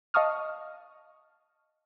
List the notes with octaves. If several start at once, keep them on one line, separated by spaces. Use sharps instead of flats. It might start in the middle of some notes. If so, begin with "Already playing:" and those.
D#5 F5 A5 C#6 D#6 F6